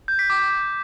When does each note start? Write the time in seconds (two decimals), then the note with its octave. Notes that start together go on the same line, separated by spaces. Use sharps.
0.08 G6
0.19 B6
0.30 D6